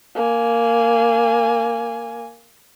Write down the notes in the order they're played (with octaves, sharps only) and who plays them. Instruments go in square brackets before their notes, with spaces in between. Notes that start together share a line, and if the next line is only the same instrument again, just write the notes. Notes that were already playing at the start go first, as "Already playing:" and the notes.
[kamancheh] A#3 G#5